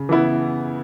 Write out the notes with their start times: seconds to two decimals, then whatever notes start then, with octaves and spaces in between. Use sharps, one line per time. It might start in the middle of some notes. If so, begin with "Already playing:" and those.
Already playing: C#3
0.09 E3 B3 E4